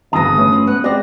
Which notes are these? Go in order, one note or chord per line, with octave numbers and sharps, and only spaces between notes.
G1 C#3 E3 F#3 B3 A5 D#6 A#6
A3 C#4 B4 C#5
F3
B3 F#6
G#3 C4 G4 D5 F#5 A#6